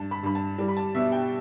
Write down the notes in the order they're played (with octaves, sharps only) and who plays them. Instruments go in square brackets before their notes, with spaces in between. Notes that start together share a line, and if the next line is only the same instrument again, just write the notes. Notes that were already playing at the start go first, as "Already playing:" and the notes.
Already playing: [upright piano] G2 A5
B5
G2 B5
A5
G3
B5
A5
B2 E5
G5